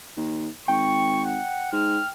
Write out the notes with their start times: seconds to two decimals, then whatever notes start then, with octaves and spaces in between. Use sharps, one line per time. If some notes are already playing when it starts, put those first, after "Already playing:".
0.17 D#2
0.68 G#1 G5 C#6
1.25 F#5
1.72 G#2 F6